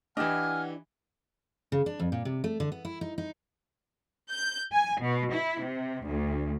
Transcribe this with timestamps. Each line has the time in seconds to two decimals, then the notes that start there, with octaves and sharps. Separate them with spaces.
0.17 E3 D4 E4 G4 D#5 F#5 G#5 F6
1.72 C#3
1.86 D4
2.00 F2
2.12 A#2
2.25 C3
2.44 A3
2.60 D3
2.72 B3
2.85 E4
3.01 D#4
3.18 D#4
4.32 G6
4.72 G#5
5.01 B2
5.32 E4
5.63 C3
6.05 D2